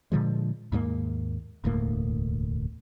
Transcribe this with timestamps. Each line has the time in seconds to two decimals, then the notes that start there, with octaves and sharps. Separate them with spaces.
0.12 A#2 D3 F3 G#3
0.72 D#2 G#2 G3 A#3
1.64 E1 D2 A2 A#3